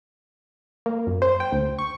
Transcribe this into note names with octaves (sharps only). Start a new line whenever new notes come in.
A#3
F#2
C5
G5
D2
C#6